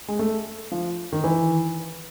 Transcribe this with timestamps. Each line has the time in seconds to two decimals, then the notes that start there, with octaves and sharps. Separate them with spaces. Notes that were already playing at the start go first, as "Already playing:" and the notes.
0.08 G#3
0.19 A3
0.72 F3
1.12 D#3
1.24 E3